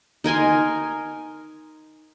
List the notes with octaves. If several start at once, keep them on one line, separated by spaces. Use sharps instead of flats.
D#4 A#4 G#5 C6